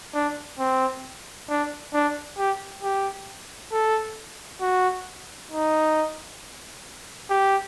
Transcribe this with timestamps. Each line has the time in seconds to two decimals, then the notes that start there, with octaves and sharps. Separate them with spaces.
0.14 D4
0.59 C4
1.49 D4
1.94 D4
2.38 G4
2.83 G4
3.73 A4
4.62 F#4
5.52 D#4
7.30 G4